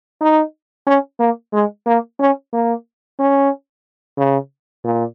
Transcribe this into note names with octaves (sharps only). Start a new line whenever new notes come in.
D#4
C#4
A#3
G#3
A#3
C#4
A#3
C#4
C#3
A#2